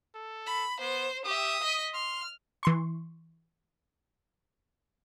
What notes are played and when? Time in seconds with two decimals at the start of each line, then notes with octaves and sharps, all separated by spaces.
0.15 A4
0.47 B5
0.80 B3 C5
1.25 G4 E5 D#6
1.63 D#5 B6
1.94 C6 F6
2.63 E3 C6 C#6